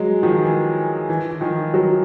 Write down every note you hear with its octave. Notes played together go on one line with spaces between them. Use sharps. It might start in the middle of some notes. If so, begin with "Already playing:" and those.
Already playing: F#3 G#3
D#3 F3
E3
E3
E3
D#3 F3
E3 F#3